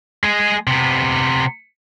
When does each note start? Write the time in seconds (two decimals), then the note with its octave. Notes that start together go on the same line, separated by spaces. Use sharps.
0.24 G#3 G#4
0.67 C3 B3